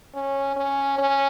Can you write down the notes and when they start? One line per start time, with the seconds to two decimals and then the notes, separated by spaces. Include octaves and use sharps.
0.14 C#4
0.56 C#4
0.98 C#4